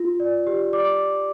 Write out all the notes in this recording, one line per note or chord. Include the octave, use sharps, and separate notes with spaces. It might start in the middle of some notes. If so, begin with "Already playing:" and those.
Already playing: F4
D5
G4
D5 D6